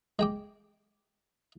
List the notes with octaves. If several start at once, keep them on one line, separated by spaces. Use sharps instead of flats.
G#3 G5 D6